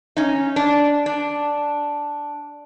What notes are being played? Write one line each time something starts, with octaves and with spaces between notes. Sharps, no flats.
C#4 D#4
D4
D4